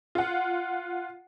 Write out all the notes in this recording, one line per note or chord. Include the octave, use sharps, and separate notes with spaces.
F4 F#5